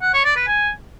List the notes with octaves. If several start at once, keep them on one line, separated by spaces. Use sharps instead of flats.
F#5
C#5
D5
B4
G#5